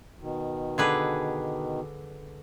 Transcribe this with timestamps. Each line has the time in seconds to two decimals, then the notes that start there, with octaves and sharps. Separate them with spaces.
0.20 B2 D#3
0.78 D3 G#4 B4